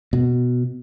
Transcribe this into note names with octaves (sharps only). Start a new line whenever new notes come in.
B2